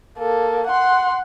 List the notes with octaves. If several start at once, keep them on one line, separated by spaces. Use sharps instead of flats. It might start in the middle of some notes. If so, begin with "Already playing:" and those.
A#3 A4
F#5 C6